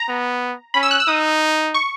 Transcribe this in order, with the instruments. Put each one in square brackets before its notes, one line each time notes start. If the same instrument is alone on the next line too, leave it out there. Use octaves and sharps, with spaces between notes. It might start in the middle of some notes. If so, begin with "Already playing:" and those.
Already playing: [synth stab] A#5
[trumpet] B3
[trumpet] C#4 [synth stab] B5
[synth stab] E6
F#6
E6
[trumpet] D#4 [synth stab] D#6
[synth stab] C#6